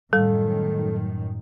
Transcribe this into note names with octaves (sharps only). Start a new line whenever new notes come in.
F#2 A2 D#3 G3 A4